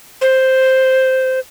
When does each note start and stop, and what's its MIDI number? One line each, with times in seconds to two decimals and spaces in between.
0.21 1.40 72